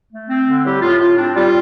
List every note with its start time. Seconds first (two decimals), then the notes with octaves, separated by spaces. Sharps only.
0.11 A3
0.29 C4
0.47 D3
0.64 A2 G3 G4
0.82 A2 F4
1.00 A2 F4
1.18 C4 D4
1.36 G3 F4